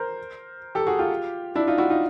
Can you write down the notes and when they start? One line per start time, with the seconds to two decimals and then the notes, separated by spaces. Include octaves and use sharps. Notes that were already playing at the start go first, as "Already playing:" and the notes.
Already playing: A#4 C5
0.75 G4 A4
0.87 F#4 G#4
0.99 F4 G4
1.55 D4 E4
1.67 D#4 F4
1.78 E4 F#4
1.90 D#4 F4